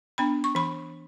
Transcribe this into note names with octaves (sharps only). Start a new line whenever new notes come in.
B3 D4 B5
C#6
E3 B5